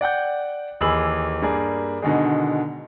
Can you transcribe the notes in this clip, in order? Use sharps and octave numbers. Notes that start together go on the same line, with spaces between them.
D5 F#5 G5 G6
D#2 E3 G#4 B5 E6 F#7
G2 A#3 G#4 D5
B2 D3 D#3 G#3